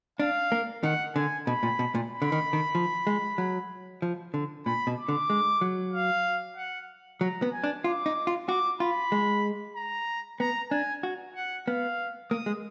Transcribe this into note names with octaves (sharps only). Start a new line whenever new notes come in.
D4 F5
A#3
D#3 F#5
D3 G#5
B2 B5
A#2
B2
A#2
B5
D3
D#3
D#3
F3
G#3
F#3
F3
D3
A#2 B5
B2
D6
D3
G#3
F#3
F5
F#5
F#3 A#5
B3
G#5
D4
F4 D6
D#4
F4
F#4 D6
F4 B5
G#3
A#5
B3 A#5
D4 G#5
F#4
F#5
B3 F5
A#3 D#6
G#3